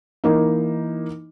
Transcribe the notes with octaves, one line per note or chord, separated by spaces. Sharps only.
E3 A#3 D#4